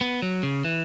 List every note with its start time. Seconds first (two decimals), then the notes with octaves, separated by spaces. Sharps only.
0.01 B3
0.22 F#3
0.43 C#3
0.65 E3